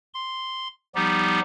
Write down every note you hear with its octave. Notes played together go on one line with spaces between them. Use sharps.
C6
F3 G3 B3 D#4 G4